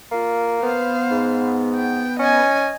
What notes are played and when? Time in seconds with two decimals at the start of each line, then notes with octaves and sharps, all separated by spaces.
0.12 A#3 F4
0.63 B3 C5 F5
1.11 G#2
1.76 G5
2.19 C#4 D#5 G#5